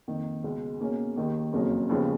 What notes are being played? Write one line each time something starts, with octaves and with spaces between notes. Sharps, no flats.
F2 D#3 A#3
C#2 B2 G#3
B2 A#3 C#4 G#4
D#2 D#3 A#3
F#1 F2 C#3 F#3 A#3
D#2 C#3 F3 G#3 B3